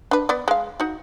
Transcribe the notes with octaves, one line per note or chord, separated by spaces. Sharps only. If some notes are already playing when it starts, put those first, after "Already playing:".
D4 B4
B3 D5
G#3 F5
D#4 F#4